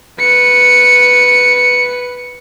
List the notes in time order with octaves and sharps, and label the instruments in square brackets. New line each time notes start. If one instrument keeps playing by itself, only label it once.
[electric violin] B4 C#7